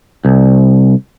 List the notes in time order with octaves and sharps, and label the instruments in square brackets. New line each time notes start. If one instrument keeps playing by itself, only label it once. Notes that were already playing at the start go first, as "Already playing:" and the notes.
[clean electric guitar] C2